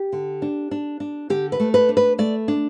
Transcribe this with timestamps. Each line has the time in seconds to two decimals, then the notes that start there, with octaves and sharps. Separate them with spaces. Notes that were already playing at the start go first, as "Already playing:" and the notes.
Already playing: G4
0.12 D3
0.42 D4
0.71 D4
1.00 D4
1.30 D3 G4
1.52 B4
1.60 A3
1.74 B4
1.89 D4
1.97 B4
2.18 A3 D5
2.48 D4